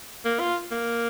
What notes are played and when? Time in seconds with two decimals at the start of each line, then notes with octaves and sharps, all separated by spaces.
0.25 A#3
0.39 F4
0.71 A#3